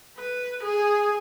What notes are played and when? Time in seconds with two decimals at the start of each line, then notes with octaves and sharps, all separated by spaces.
0.18 B4
0.63 G#4